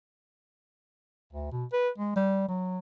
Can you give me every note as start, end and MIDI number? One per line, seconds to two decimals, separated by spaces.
1.33 1.50 38
1.52 1.65 47
1.73 1.89 71
1.98 2.13 56
2.16 2.47 55
2.48 2.78 54